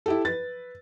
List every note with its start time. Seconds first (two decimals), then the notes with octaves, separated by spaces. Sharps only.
0.06 E4 G4 A4
0.25 B4 A6